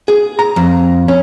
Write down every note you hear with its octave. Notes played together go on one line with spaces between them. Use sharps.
G#4
A#5
F2
C#4